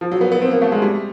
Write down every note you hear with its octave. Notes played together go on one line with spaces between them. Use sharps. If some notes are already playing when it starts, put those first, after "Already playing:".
F3
F#3
B3
B3
C4
A#3
A3
G#3
G3